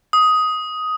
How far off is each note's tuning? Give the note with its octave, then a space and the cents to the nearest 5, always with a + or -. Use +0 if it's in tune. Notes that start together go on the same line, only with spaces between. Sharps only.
D#6 +10